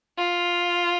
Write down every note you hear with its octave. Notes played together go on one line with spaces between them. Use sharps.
F4